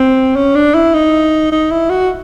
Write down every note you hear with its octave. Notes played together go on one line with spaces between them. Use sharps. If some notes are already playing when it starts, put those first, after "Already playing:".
Already playing: C4
C#4
D4
E4
D#4
D#4
E4
F#4